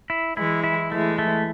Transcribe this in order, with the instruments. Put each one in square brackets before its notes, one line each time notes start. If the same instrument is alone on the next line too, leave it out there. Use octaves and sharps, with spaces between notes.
[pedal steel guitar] E4
[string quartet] E3 G#3 [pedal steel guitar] E4
[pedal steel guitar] E4
[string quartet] E3 G#3 [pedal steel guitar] A3
[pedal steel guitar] A3